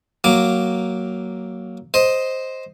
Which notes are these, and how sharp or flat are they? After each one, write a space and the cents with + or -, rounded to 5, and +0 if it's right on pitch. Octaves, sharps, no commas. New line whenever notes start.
F#3 +10 A#3 +0 D6 +0
C5 +0 D#5 +5